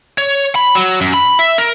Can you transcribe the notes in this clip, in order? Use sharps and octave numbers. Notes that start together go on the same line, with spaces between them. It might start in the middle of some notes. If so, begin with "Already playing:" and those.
C#5
B5
F#3
F#2
B5
E5
A#4